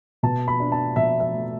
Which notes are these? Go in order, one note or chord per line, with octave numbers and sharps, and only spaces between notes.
B2 A5
B5
D4
A5
B2 E5
E5
A3